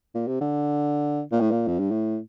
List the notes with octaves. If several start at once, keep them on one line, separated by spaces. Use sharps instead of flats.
A#2
C3
D3
A#2
A2
A#2
F2
G2
A2